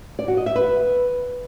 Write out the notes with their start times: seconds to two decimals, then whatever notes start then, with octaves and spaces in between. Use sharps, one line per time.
0.19 D5
0.28 F#4
0.37 D#5
0.46 E5
0.55 B4